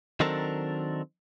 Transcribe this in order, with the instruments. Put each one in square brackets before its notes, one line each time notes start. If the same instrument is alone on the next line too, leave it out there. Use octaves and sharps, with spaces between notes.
[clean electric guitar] D#3 F#3 C4 D4 A4 A#4